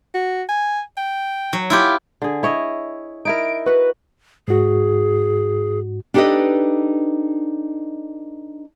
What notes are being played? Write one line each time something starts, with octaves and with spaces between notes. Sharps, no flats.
F#4
G#5
G5
F#3
E4 F4 G4
D3 G#4
E4 C#5 D#5
D#4 E4 A#4 D7
F#4 B4 F#5
G#2 F#4 G#4
D4 D#4 G4 A4 B4 D#5